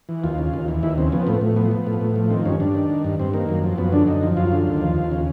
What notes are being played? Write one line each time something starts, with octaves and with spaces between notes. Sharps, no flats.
E3
D#2 F4
C#3
D#2
E3
D#2 E4
C#3 C4
F3 B3
C4
A2 B3
A2
F3 B3
F3
A2
A2
F3
D#3 C4
G2 C#4
G2 D4
D#3
D#3
G2
G2 C4
D#3 A#3
F#2
F3
F#2 B3
D3 D4
F#2 D#4
F3
F#2 F4
D3
D#2
F3
D#2
C#3